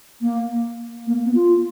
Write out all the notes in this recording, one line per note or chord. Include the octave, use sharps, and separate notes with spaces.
A#3
A#3
B3
F4